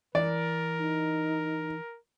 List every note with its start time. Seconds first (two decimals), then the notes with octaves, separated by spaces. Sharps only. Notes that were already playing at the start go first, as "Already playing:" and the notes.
0.15 E3 A#4 D5
0.79 D#4